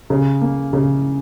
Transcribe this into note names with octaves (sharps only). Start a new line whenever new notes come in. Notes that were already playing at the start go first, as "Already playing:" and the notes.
C#3
A#3
C#3